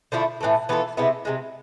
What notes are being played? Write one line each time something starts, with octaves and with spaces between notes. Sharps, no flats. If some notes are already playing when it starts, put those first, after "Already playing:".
D3 F3 A3 E4
A2 E3 A3
E3 B3 F4 A4
C3 G#3 B3 E4
C3 F3 G#3